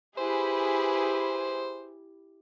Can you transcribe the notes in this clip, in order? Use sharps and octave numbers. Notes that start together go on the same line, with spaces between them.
E4 G4 G#4 B4 C5